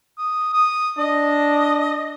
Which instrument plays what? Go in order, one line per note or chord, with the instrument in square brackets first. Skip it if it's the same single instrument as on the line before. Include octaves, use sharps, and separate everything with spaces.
[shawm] D#6
D#6
[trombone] D4 [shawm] D#5